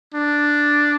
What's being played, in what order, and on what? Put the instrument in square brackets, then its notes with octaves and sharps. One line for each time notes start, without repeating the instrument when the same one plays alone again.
[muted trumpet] D4